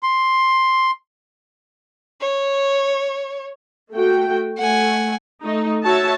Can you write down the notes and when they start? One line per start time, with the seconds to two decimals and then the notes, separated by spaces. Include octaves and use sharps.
0.03 C6
2.21 C#5
3.93 A3 F#4 G5
4.59 A3 F#5 G#5
5.43 A3 D#4
5.85 F#4 C#5 E5 A5